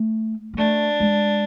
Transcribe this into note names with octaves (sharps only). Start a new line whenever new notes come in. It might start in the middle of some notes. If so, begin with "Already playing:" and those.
Already playing: A3
A#3
A3 D4
G#3